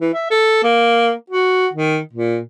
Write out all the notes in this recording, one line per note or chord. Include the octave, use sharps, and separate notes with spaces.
E3
E5
A4
A#3
F#4
D#3
A#2